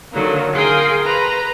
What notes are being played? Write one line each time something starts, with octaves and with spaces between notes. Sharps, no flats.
D3 D#3 F#3 A#3
G#4 A#4 F5 G5 C6 D#6
B4 A#5 C6